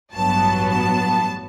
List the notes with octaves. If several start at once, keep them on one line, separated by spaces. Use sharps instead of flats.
A1 G2 F#3 B3 A5
A5